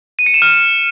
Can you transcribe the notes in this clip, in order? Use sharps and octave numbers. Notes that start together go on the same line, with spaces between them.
D#7
C#7
E7
F6